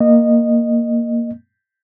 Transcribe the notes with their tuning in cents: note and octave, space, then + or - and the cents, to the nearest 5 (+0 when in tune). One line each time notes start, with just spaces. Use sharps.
A#3 +0 D#5 -15